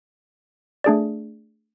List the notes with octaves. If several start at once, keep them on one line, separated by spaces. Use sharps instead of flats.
A3 D4 G#4 D5